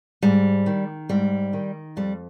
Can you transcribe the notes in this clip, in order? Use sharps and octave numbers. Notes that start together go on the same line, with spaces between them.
G#2 G3
D#3
G#2 G3
D#3
F2 G3